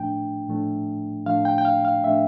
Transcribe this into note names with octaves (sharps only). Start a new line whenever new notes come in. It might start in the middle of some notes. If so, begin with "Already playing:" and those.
Already playing: A2 F3 A3 D4 G5
A2 F3 A3 D4
A2 F3 A3 D4 F5
G5
G5
F5
F5
A2 F3 A3 D4 E5